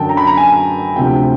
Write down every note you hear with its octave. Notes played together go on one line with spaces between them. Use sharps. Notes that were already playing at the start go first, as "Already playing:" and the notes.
Already playing: F#2 D3 F#3 G5 A5
A#5
B5
A#5
G#5
D2 C3 F3 G5